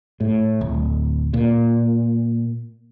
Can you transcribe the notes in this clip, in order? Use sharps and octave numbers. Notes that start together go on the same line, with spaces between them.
A2
D1
A#2